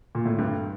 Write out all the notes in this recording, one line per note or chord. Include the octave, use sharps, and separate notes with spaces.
A#2
A2
G2